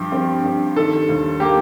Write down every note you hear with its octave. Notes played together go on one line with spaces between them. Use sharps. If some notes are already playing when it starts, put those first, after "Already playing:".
Already playing: G2 F3 G4
C4
G2
D#3 A4
D#2
A#3 G4